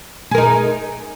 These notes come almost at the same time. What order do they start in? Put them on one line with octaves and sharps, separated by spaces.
G#4 A#4 D#4